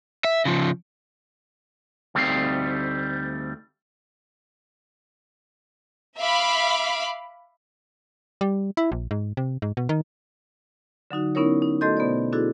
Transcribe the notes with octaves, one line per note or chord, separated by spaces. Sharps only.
E5
C#3 F3
D2 G3 A3 C4 D#4 F5
E5 F5 B5 D6
G3
E4
A#1
G#2
C3
G#2
B2
D#3
D3 F#3 D#4 F#4
B3 C#4 D#4 E4 A#4 C#5
D#4
A3 F#4 A4 D#5 C6 G6
B2 B3 C5 D5
D4 E4 F#4 G#4 A4